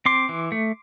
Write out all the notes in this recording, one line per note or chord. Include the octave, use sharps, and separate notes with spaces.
C4 C6 D6
E3
A3